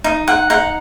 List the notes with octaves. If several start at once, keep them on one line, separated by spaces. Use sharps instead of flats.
D#4
F#5
D#4 F#5